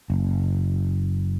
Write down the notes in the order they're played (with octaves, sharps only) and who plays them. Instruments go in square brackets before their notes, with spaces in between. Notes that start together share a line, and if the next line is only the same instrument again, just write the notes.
[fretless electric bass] F#1